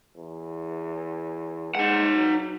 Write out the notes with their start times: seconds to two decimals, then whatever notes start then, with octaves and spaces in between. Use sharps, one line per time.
0.17 E2
1.75 G#3 D#4 F#5
2.15 F#3